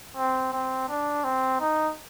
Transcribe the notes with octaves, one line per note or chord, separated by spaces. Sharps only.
C4
C4
D4
C4
D#4